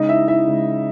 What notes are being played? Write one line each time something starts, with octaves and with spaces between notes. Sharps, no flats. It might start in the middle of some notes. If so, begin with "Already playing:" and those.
Already playing: C#3 G#3 D#4 D#5
E4 E5
E4 E5
C#3 G#3